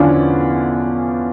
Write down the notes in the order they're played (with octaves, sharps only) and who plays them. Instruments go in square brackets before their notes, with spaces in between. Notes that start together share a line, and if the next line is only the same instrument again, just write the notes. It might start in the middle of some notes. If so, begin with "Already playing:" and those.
Already playing: [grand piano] E2 D3 F3 C#4 D4 E4 F4